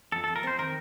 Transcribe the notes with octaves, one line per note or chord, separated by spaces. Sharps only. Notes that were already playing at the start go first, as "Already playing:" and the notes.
F2 A4
F2 A4
A#4
C4 C5
D#3 A#4